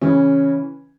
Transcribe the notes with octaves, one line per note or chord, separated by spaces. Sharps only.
C#3 E3 C#4